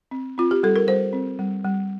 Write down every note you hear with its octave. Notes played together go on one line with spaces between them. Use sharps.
C4
C4 F4
G4
G3 A4
A#4
G3 C5
C4
G3
G3